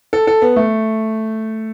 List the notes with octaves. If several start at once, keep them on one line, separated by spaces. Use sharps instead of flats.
A4
A4
B3
A3